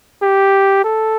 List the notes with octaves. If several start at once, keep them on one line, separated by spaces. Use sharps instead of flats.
G4
A4